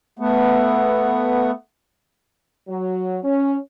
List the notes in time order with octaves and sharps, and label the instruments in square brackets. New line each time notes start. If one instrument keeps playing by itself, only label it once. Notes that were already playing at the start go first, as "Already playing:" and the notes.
[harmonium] A3 B3
[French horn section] F#3
C#4